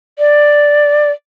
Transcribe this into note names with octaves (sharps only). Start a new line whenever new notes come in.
D5